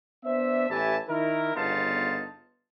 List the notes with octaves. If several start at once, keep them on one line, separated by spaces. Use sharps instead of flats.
B3 D4 C5 E5
A1 E3 G4 E5 G#5 A5
D#3 E4 A#4
G1 C#3 B3 D#4 F4 A5